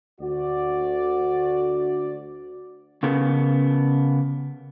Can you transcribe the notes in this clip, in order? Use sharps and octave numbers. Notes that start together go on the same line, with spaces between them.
D2 F#4 D5
C#3 B3 A#4